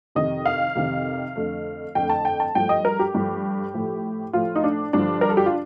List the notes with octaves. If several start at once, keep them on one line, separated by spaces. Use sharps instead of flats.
F2 C3 D#3 D#5
F5
F2 C3 D#3
F2 D3 A3
F2 D3 A3 G5
A5
G5
A5
G2 F3 A3 G5
D#5
A#4
G4
G2 F3 A3
A2 F3 A3
A2 F3 A3 F4
D#4
D4
G2 D3 F3 D4
A#4
A4
G4
F4